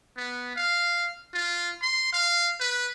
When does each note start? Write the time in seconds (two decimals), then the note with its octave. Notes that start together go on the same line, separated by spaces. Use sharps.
0.17 B3
0.56 F5
1.34 F4
1.82 C6
2.13 F5
2.60 B4